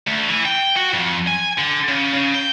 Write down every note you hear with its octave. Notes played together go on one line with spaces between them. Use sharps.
D2
E3
G5
F#4
F2
G#5
D3
C#3
C#3
G5